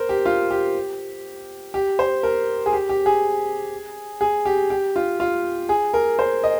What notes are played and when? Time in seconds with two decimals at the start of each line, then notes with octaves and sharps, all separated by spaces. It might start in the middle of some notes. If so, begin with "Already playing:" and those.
Already playing: A#4 C5
0.09 G4
0.26 F4
0.50 G4
1.74 G4
1.99 C5
2.23 A#4
2.66 G#4
2.73 G4
2.89 G4
3.06 G#4
4.21 G#4
4.45 G4
4.70 G4
4.96 F4
5.20 F4
5.69 G#4
5.94 A#4
6.19 C5
6.44 D#5